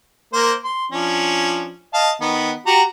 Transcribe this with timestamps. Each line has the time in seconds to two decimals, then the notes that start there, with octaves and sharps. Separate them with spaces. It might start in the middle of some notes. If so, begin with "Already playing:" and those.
0.33 A#3 A#4 C5
0.64 C6
0.92 F3 C#4 D4
1.94 D#5 F5 A5
2.21 D#3 B3
2.66 F#4 G4 A#5